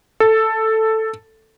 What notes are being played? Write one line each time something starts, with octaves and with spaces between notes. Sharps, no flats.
A4